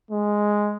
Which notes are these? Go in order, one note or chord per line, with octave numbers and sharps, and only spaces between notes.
G#3